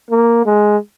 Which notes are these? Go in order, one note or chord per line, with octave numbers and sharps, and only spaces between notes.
A#3
G#3